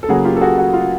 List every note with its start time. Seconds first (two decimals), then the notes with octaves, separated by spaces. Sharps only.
0.03 A4
0.09 C#3 F#3 A#3 F#4 G#4
0.25 F4 G4
0.37 A4
0.41 F#4 G#4
0.58 F#4
0.73 F4